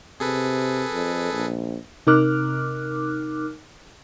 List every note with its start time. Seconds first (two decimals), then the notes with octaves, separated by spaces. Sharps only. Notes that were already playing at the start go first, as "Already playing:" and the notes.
0.20 C3 G#4 A4 B4
0.93 F2
1.32 A#1
2.07 C3 D#4 A#4 D6 F6 F#6